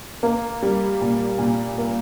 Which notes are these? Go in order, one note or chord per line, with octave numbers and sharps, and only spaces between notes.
A#3
G3
A#2
A#2
A#3